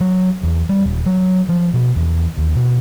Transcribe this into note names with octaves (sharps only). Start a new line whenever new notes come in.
F#3
E2
G3
D#1
F#3
F3
B2
E2
D#2
B2